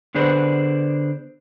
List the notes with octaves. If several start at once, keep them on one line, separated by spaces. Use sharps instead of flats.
D3 B3 G#4 B4 C5 D5